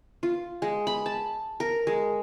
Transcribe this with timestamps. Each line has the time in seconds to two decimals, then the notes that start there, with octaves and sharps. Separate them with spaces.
0.23 F4
0.62 G#3
0.87 B5
1.06 A5
1.60 A#4
1.87 G#3